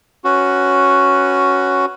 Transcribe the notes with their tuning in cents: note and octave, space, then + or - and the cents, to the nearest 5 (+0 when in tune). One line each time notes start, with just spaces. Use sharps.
C#4 +0 F#4 +0 B4 +0